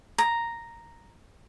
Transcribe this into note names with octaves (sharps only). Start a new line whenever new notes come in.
A#5